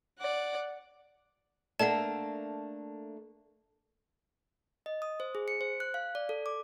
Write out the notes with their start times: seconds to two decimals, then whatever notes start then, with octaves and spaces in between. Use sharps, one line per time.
0.19 D5 F#5
1.79 A3 A#3 D4 D5 F#5 A5
4.86 D#5
5.02 D#6
5.20 C5
5.35 G#4
5.48 C#7
5.61 C5
5.80 F#6
5.94 F5
6.15 D5
6.29 A4
6.46 D6